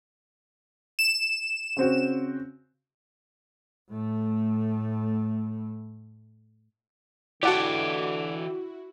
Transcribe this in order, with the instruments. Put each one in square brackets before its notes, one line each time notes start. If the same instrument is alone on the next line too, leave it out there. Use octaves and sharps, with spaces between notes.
[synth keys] E7
[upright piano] C#3 C4 F#4
[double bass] A2 A3
[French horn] D3 [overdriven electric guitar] E3 G4 [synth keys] E4 F#4 [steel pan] D5 F#5 A5